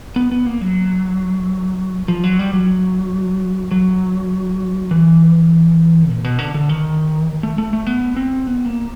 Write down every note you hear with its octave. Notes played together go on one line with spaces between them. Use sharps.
B3
B3
A#3
F#3
F3
F#3
G3
F#3
F#3
E3
A#2
B2
D3
D3
D#3
A3
A3
A3
B3
C4
B3
A#3